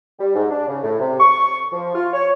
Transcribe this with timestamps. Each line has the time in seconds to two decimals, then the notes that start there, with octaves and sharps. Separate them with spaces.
0.19 G3
0.35 G#2
0.50 D4
0.68 C#3
0.84 A2
0.99 C3
1.20 C#6
1.73 F3
1.95 F4
2.14 C#5